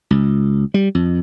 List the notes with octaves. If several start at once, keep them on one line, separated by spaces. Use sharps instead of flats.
C#2
G3
F2